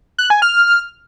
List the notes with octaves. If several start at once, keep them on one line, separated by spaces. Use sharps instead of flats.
F#6
G#5
F6